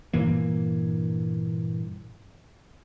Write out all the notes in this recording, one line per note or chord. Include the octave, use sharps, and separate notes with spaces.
G2 A#2 E3 A#3